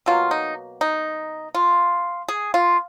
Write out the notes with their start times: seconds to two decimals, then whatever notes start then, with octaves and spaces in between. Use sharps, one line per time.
0.06 B2 F#3 A#3 F4
0.31 D#4
0.81 D#4
1.54 F4
2.28 G#4
2.54 F4